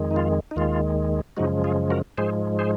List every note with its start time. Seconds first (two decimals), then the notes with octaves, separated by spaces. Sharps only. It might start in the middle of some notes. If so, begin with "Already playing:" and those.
Already playing: F2 D#3 G#3
0.11 D#4
0.16 F4
0.51 D#4
0.56 D#2 D#3 G#3 F4
1.37 F#2 C#3 F3 G#3 D#4 F#4
1.64 F4 G#4
1.90 F#4 A#4
2.18 G#2 F3 G#3 G#4 C5
2.59 G#4 C5